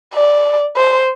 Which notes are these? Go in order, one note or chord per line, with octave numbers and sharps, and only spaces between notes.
D5
C5